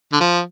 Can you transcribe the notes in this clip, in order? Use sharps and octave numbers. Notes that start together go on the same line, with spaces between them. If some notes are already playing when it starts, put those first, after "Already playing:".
D3
F3